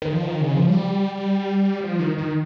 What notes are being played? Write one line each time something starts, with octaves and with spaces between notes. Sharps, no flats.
D#3
F3
D#3
C#3
F3
G3
F3
D#3
D#3